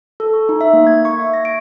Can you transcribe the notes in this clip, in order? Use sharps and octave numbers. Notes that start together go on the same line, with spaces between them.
A4
C#6
D#4
E5
A#3
G#6
C#6
E5
A#6
D7